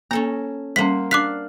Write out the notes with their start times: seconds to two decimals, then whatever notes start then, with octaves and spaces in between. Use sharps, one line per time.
0.11 A#3 C#4 A4 A#5
0.76 G3 A#3 C#4 C5 F#5 B6
1.11 D4 F5 D6 F#6 B6